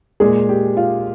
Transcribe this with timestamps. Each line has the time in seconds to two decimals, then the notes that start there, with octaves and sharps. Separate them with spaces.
0.20 A#2 G#3 G#4
0.49 G4
0.77 F4